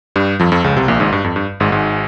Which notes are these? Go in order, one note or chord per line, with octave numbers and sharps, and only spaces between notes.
G2 G3
F2 F3
F2 F3
C#2 C#3
C2 C3
A#1 A#2
G#1 G#2
G2
F2
G2
G#1 G#2
G#1 G#2